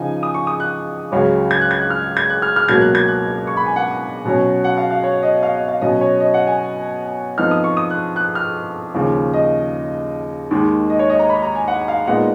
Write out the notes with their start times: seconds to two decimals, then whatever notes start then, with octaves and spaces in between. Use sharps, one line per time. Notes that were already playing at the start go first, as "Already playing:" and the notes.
Already playing: C#3 F3 D#4 G#5
0.23 D#6
0.34 C#6
0.47 D#6
0.60 F#6
1.12 C#2 C#3 F#3 C#4
1.51 G#6
1.61 F#6
1.71 G#6
1.81 F#6
1.90 F6
2.17 G#6
2.30 F#6
2.42 F6
2.56 F6
2.69 C#2 B2 F#3 A#3 G#6
2.81 F#6
2.95 G#6
3.08 F#6
3.47 C#6
3.57 B5
3.66 G#5
3.76 F#5
4.26 B2 F#3 C#4
4.64 F#5
4.77 F5
4.90 F5
5.04 C#5
5.22 D#5
5.43 F5
5.55 D#5
5.68 F5
5.81 B2 F#3 C#4 D#5
6.01 C#5
6.20 D#5
6.34 F#5
6.47 G#5
7.38 F2 F3 B3 D#4 F6
7.51 D#6
7.64 C#6
7.77 D#6
7.90 F#6
8.16 F#6
8.35 F6
8.94 D#2 C#3 F3
9.33 D#5
10.51 D#2 D#3 G#3
10.90 D#5
10.99 C#5
11.10 D#5
11.19 A#5
11.29 B5
11.42 A#5
11.55 G#5
11.68 F#5
11.88 F5
12.07 A#2 G#3 B3 D#4 F#5